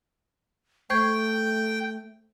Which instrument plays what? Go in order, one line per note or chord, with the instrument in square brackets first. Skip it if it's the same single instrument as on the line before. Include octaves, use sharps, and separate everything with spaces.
[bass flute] A3 [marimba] C5 C#6 G#6 [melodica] G5